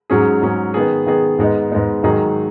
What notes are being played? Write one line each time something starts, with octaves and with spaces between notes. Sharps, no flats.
G#2 F#3 C#4 G#4
G#2 F#3 C#4 G#4
D#3 B3 G#4
D#3 B3 G#4
G#2 G#3 B3 D#4
G#2 G#3 B3 D#4
G#2 D#3 F#3 D#4 G#4